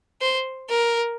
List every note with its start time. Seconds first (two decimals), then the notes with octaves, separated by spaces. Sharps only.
0.21 C5
0.70 A#4